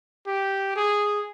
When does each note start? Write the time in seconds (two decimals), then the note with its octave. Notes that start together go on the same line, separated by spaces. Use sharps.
0.27 G4
0.76 G#4